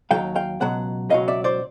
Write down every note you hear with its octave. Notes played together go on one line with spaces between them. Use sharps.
D#2 D#3 F#3 F5 G5
F5 G5
C#2 B2 F#3 F#5
C#2 B2 F#3 D#5 F5
D5 E5
C5 D5